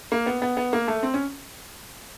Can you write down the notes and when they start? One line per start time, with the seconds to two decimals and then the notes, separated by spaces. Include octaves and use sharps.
0.12 A#3
0.26 B3
0.42 B3
0.57 B3
0.73 A#3
0.88 A3
1.03 C4
1.14 C#4